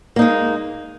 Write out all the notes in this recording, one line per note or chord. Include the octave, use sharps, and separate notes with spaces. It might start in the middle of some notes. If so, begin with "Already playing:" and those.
G#3 A#3 D#4